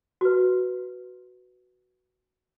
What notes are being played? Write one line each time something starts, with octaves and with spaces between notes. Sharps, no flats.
F#4 B4